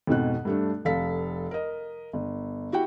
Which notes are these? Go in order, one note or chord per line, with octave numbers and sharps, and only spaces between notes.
F2 G#2 B2 F#6
G2 A3 D4
F1 A4 F5 B6
A#4 D#5
G1
E4 F#4 G4 F#5 G5